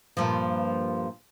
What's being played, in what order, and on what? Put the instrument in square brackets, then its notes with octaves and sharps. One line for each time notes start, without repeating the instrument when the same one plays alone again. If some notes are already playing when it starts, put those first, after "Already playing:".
[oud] G2 A#2 F3